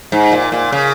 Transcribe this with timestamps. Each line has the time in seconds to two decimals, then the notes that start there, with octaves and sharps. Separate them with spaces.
0.12 G#2
0.32 A#2
0.52 A#2
0.72 C#3